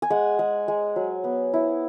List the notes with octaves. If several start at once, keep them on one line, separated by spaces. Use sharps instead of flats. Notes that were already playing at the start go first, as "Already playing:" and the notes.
G#5
G#3 F#5
G#3
G#3
F#3
B3
E4